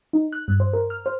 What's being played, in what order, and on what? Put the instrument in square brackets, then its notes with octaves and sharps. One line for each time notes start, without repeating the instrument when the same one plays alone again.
[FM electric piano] D#4
F#6
G2
C5
A#4
F6
C5